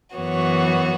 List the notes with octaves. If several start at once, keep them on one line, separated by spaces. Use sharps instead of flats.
F#2 E3 B3 F#4 C#5